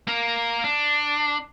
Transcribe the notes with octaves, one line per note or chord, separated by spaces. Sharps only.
A#3 A#4
D4